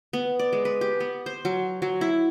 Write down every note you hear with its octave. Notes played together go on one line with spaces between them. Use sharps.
B3
D5
G#3
B4
G4
B3
C5
F#3
F#3
E4